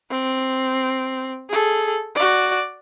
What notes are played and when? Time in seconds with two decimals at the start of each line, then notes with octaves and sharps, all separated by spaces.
0.11 C4
1.50 G#4 A4
2.15 F#4 D5